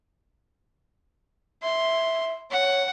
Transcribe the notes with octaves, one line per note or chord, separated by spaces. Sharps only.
E5 C6
C#5 F#5